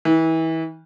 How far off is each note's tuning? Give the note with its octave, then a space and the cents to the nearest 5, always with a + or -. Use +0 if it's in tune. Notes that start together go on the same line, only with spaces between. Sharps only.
E3 -30